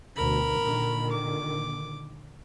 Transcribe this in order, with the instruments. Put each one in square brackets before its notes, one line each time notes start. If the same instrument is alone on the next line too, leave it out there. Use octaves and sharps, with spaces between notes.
[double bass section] D2 B2 [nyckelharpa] A#4 B5
[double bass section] A#2 D3 D#3
[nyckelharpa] D6